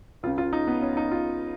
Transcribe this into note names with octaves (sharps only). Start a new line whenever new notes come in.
C#2 C#3 F4
F4
D#4
B3
C#4
D#4
F4